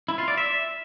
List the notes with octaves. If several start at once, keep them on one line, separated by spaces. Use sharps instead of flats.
E4
F4
D5
E5